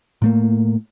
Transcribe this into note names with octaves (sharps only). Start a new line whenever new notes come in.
A2 A3 A#3